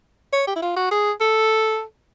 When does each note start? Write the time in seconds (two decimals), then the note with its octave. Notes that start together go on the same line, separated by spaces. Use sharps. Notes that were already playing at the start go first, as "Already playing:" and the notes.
0.33 C#5
0.47 G4
0.56 E4
0.62 F4
0.76 F#4
0.91 G#4
1.21 A4